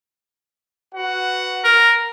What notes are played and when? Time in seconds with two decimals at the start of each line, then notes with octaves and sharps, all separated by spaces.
0.94 F#4 B4 F#5
1.64 A#4